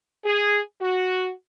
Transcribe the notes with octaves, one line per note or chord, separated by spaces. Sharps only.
G#4
F#4